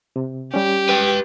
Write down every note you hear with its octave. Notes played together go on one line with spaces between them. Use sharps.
C3
G3 C#4 G4
B4 G5